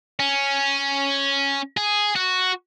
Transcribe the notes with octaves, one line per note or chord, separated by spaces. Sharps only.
C#4
G#4
F#4